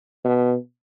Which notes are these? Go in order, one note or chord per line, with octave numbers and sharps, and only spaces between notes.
B2